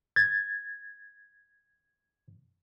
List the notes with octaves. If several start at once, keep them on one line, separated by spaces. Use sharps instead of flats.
G#6 A6